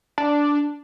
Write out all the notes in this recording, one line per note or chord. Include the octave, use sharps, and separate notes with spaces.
D4